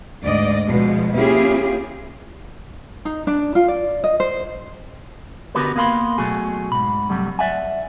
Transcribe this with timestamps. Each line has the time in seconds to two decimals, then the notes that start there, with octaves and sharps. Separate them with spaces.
0.24 D2 G#2 D5 D#5
0.67 B2 F3 G#3
1.16 A#3 C#4 E4 F4 G4 G#4
3.05 D#4
3.27 D4
3.55 F4
3.68 D5
4.04 D#5
4.20 C5
5.55 D3 B3 F#4 G4 A#4 B4
5.76 A#3 B3 A#4 F5 B5 C6
6.18 B2 F#3 A3 F#4 G#4
6.72 G#2 B5
7.09 G2 C3 F#3 G3 A3
7.39 D5 E5 F#5 G#5